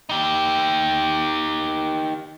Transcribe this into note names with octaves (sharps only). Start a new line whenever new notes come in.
D#4 G4